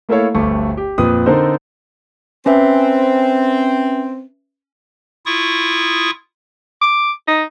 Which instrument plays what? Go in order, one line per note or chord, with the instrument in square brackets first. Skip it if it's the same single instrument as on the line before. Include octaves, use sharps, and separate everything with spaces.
[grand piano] A3 A#3 E4 A4 C#5 F5
G1 D2 G2 A3 G4 C#6
G4
F2 A#2 B4 D#6
D3 C4 D#4 A4 A#4 C5
[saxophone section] C4 [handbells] C#4 B4 E5
[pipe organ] E4 F4 C#6 D#6
[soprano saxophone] D6
D#4